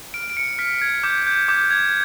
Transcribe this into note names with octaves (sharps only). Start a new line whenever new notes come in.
F6 D7
D7
C#7
F6 B6
G#6
D6 G6
G6
D6 G6
G#6